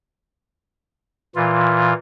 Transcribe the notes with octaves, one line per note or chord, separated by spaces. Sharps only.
A#2 E3 F4